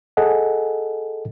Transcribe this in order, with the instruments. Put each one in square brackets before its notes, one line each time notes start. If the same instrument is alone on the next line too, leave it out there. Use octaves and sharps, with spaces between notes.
[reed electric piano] G#4 A4 D#5 F#5 G#5